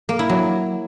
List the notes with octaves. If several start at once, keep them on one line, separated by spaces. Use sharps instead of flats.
A#3
E4
F#3